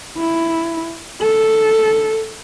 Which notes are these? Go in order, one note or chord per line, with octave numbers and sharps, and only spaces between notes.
E4
A4